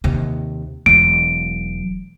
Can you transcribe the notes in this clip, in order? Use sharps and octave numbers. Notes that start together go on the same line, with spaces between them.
D#2 C3
E1 F#3 D7